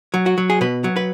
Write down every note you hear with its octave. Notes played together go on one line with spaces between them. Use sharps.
F#3
F#4
F#3
G#4
B2 B4
F#3
B4